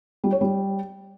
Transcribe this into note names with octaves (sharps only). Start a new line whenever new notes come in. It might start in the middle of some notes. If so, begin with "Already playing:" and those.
G3
C#5
G3